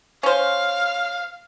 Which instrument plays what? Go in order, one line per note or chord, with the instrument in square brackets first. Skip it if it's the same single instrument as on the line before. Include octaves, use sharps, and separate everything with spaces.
[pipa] C#4 C5 [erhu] F5